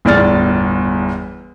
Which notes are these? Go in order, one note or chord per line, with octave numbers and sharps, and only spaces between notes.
G1 E2 A2 D5 F6 A6